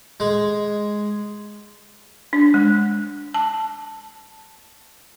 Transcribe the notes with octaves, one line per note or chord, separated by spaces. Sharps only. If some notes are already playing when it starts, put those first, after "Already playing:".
G#3
D4
G#3
A5